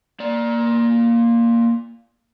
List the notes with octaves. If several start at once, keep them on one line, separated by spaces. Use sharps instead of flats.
A#3 D5